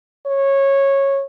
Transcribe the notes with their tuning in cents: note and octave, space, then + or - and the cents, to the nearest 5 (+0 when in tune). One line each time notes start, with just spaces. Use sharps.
C#5 -15